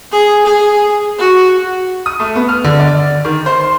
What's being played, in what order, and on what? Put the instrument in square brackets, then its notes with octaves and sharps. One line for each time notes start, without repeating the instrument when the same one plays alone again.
[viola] G#4
G#4
F#4
[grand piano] D#6
A3
B3
F6
D3
D5
D#3
C5
C6